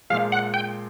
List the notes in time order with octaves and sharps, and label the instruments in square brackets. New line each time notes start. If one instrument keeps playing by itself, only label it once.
[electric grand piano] A#2 F3 G#3 [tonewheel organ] F5
[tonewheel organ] F#5
G5